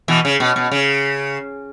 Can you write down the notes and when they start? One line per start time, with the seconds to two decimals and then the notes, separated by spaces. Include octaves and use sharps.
0.08 B2 E3
0.25 C#3
0.40 B2
0.56 B2
0.71 C#3